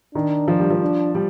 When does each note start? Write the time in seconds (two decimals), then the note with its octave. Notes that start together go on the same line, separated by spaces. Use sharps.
0.14 D#3 D4
0.48 F3
0.60 G3
0.70 F3
0.82 D4
1.15 G3